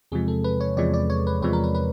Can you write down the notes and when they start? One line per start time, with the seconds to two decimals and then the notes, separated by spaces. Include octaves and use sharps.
0.12 E2 C3 F3 G#3 G#4
0.28 A4
0.44 B4
0.60 C#5
0.77 E2 C3 F3 G#3 D5
0.94 D5
1.10 C#5
1.27 B4
1.42 E2 C3 F3 G#3 B4
1.53 A#4
1.64 B4
1.75 B4